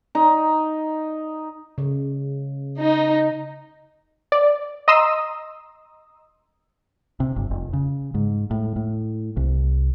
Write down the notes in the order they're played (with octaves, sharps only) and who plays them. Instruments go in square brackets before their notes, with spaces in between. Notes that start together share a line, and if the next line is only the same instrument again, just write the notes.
[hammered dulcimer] D#4
[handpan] C#3
[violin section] D#4
[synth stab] D5
D#5 A#5 C6 D#6 E6
[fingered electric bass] C3
G1
F1
C#3
G#2
A2
A2
C2